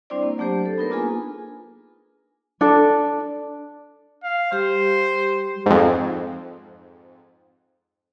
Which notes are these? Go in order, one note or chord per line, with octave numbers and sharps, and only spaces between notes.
G3 C4 D4 E4 C5 D5
A#3
F#3 A3 D4 G4 C5
A4
B3 D#4 A#4 B4
A#3 D4 F4 G#4 G#5
D4 A4
F5
G3 G4 C5
F2 G#2